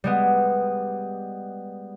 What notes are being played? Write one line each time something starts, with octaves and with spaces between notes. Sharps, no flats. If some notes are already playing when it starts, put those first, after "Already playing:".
G3 G#3 B3